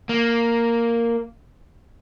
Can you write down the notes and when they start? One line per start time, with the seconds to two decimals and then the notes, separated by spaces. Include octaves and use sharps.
0.09 A#3